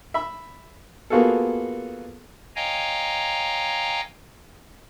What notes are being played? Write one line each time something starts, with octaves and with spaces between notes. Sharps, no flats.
E5 B5
A#3 B3 F4 F#4 G#4 A4
C#5 D#5 F5 G5 G#5 A#5